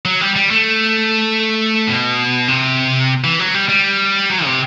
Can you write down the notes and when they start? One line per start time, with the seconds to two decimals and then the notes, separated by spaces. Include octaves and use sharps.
0.05 F#3
0.21 G3
0.36 G3
0.51 A3
1.87 B2
2.48 C3
3.24 E3
3.39 F#3
3.54 G3
3.69 G3
4.30 F#3
4.45 C3